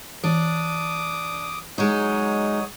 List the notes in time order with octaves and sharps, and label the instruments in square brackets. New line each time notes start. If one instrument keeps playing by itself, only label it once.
[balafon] E3 [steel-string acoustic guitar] D4 [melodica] D6 D#6
[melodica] F#3 C#5 D#6 [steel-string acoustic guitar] G#3 D#4